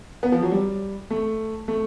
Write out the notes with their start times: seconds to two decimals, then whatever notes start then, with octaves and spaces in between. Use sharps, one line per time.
0.23 B3
0.32 F3
0.42 F#3
0.52 G3
1.10 A3
1.68 A3